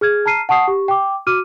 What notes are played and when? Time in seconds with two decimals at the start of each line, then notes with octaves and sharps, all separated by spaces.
0.01 G#4 F6 G#6
0.26 A5 A#5 F6 C7 D#7
0.49 F#5 A5 C#6 D#6 C7
0.68 G4 C#6
0.88 G5 D6
1.27 F#4 D6 F6 D#7